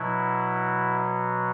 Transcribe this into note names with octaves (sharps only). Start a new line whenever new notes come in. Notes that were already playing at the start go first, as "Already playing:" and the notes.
Already playing: B2 F#3 E4